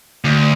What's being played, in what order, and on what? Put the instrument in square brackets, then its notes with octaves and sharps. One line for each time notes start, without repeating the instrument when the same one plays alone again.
[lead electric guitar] D2